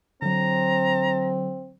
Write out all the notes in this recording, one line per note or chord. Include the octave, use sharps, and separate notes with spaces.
D3 F#3 C4 A#5